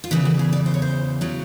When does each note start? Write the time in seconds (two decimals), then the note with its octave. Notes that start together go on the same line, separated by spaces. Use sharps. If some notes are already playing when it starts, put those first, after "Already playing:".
0.04 F4
0.11 E2 C#3 E3 E4
0.25 F#4
0.39 G#4
0.53 D5
0.66 C5
0.74 C#5
0.82 C5
1.21 C#3 F#3